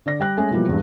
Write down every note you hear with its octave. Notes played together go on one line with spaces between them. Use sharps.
D3 D5 A#6
G3 G5 F#6
G#3 A3 C#4 G#4
B2 E3 F3 G3 A#3
E2 G2